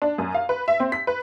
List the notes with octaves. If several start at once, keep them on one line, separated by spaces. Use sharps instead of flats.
D4
F#2
F5
B4
E5
C4
B6
B4